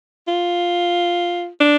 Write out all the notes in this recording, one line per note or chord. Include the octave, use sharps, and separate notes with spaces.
F4
D4